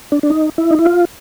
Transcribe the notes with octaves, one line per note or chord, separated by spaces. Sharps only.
D4
D4
D#4
E4
D#4
E4
F4